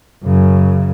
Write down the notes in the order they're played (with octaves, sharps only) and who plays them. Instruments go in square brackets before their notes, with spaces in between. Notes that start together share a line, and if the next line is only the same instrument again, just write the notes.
[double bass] F#2 C#3